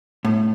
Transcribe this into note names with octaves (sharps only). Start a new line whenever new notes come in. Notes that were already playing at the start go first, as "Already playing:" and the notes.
A2